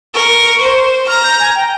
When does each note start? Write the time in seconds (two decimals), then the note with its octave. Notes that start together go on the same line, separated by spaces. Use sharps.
0.14 A#4 C#6
0.61 C5
1.08 A#5 F6
1.24 G6
1.40 G#5
1.55 G5